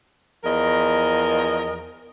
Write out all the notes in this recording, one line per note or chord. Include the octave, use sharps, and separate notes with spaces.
E2 F3 A#4 D#5